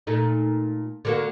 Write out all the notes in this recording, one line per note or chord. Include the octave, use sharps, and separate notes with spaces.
A#2 A3 D#4
D3 A#3 F#4